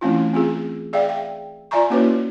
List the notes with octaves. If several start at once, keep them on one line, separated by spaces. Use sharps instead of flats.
E3 A3 C4 C#4 E4 F4
C4 F4 G#4
G#4 D5 E5 F5 G5
G5
F4 D5 E5 G#5 A#5 C#6
A#3 C#4 E4 F#4 B4 C#5